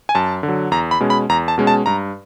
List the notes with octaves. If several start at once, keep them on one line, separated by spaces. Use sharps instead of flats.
G#5
F#2 A5
D3
F#3
E2 A#5
B5
B2 G#3 C#4
B5
E2 A#5
A5
B2 G#3 C#4
A5
G2 A#5